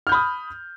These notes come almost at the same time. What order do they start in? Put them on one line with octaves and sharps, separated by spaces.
F6 G6 B5 D#6